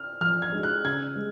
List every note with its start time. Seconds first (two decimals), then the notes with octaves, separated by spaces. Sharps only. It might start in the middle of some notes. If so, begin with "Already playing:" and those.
Already playing: F6
0.21 F3 F6
0.42 G#6
0.52 G#3 D#4 F#4
0.63 F#6
0.84 C#3 G#6
1.16 G#3